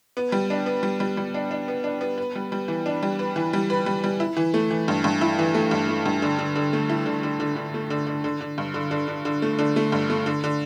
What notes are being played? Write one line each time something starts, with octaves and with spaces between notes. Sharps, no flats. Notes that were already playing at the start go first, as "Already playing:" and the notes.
B3
G3
D4
B3
G3
G3
G3
D4
D4
B3
D4
B3
B4
G3
G3
E3
D4
G3
B4
E3
G3
B4
G3
G3
E4
E3
A3
E3
G2
G2
E4
E3
A3
G2
A3
G2
D3
D3
D3
A3
E4
D3
D3
D3
D3
A3
D3
D3
D3
D3
G2
D3
D3
D3
D3
A3
D3
A3
G2
A3
D3
D3